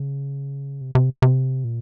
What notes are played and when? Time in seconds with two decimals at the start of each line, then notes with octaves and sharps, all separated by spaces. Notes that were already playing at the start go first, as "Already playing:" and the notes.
Already playing: C#3
0.81 C3
0.95 C3
1.22 C3
1.64 A#2